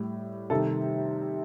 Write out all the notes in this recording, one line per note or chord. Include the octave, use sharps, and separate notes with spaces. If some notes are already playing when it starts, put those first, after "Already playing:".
Already playing: A2 G3 G4
C3 D#3 G3 A4